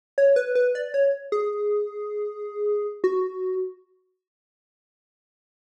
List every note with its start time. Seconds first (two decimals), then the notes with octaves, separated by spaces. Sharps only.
0.18 C#5
0.36 B4
0.55 B4
0.75 D5
0.94 C#5
1.32 G#4
3.04 F#4